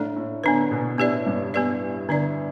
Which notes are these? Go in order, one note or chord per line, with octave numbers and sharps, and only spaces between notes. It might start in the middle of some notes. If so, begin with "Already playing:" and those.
Already playing: A2 A3 D4 A4 D5
A2
D3 B3 D4 B4
B2
A2 B3 G4 B4 D5
G2
B3 G4 B4 D5
D3 B3 D4 B4 D5